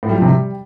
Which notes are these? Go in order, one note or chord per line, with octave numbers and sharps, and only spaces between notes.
A2
G3
F3
C3
G3